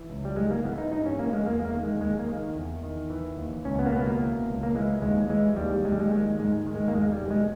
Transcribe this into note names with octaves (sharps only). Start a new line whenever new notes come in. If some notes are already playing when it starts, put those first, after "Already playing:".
Already playing: E3
C#2
G3
G#2 G#3
A#3
E3 B3
D#4
G2 D#4
C#4
E3 A#3
G#3
E2 A#3
A#3
D#3
G#3
D#2 G#3
A#3
D#3
E2
D#3
E3
D#2
C#2 C#4
B3
A#3
B2 B3
A#3
E3
C#2
A#3
E3 G#3
D#2 G#3
E3 G#3
D#2 G3
D#2 G#3
G3
G#3
D#3 G#3
G#2 G#3
D#3
G#3
A#3
E2 G#3
G3
B2
G#3